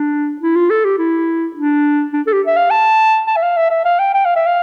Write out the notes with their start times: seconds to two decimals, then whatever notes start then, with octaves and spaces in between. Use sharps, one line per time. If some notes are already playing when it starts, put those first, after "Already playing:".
Already playing: D4
0.41 E4
0.56 F4
0.70 A4
0.84 G4
0.98 E4
1.56 D4
2.13 D4
2.27 A4
2.33 G4
2.47 E5
2.56 F5
2.70 A5
3.27 A5
3.36 E5
3.42 F5
3.57 E5
3.70 E5
3.85 F5
3.99 G5
4.14 G5
4.25 F5
4.36 E5
4.46 F5